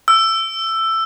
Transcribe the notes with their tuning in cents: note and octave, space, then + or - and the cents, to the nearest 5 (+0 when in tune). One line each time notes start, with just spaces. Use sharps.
E6 +10